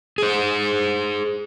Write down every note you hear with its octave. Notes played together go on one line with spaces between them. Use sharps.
G#4 C5